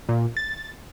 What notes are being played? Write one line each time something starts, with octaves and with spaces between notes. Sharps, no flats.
A#2
A6